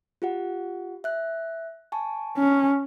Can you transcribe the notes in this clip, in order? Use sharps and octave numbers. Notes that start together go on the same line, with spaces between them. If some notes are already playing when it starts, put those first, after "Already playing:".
F4 G4 F#5
E5 F#6
G#5 A5 C#6
C#4